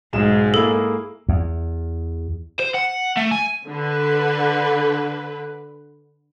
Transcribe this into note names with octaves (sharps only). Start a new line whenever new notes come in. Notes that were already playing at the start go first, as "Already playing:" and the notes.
B1 G#2 G#3 E7
A#3 E4 G#4 A4
E2
C5
F#5
A3
G#5
D3 B4